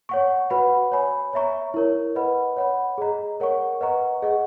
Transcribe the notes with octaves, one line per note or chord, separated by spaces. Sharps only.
C#5 F#5 C#6
F#4 B4 F#5 B5
C#5 G#5 B5
C#5 E5 A#5 C#6
E4 A#4 C#5
B4 D#5 F#5 B5
C#5 F#5 B5
G#4 D#5 A#5
A#4 C#5 F#5 C#6
B4 D#5 F#5 A#5 C#6
G#4 D#5 F#5 C#6